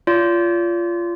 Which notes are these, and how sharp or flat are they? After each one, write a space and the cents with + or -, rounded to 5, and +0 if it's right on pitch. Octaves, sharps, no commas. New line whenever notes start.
F4 -15 D5 -40